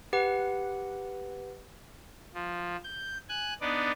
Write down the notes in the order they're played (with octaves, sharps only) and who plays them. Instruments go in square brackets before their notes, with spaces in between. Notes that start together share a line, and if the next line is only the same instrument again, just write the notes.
[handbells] G4 B4 F#5
[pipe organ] F3
G6
G#5 F#6
B3 D4 D#4 D5